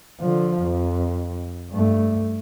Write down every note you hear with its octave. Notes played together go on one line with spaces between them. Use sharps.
D3 F3
F2
G2 A3